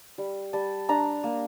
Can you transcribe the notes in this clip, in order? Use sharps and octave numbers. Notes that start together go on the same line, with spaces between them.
G3
G3 A5
D4 A#5
A#3